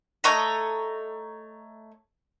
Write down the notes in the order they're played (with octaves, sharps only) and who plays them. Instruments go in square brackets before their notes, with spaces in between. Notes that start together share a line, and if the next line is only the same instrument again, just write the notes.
[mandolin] A3 C#5 D#5 A#5